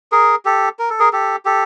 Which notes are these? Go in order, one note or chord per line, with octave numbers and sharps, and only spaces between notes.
G#4 A#4
G4 A4
A#4
A4
G#4 A#4
G4 A4
G4 A4